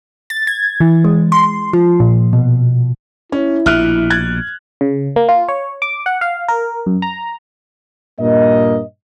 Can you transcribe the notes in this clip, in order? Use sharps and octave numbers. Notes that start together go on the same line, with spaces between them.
A6
G#6
E3
G#3
C6
F3
A#2
B2
C#4 E4
A#1 B2 E5 F6 F#6
F#6 G#6 A6
C#3
A#3
F4
C#5
D6
F#5
F5
A#4
F#2
A#5
G2 A#2 A#3 D#5